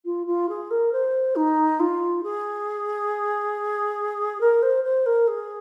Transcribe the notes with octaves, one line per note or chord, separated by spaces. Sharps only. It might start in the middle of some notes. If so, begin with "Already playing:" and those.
F4
F4
G#4
A#4
C5
D#4
F4
G#4
A#4
C5
C5
A#4
G#4